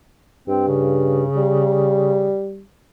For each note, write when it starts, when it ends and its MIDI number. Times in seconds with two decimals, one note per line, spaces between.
0.48 1.24 43
0.48 0.65 60
0.68 2.30 49
1.36 2.63 55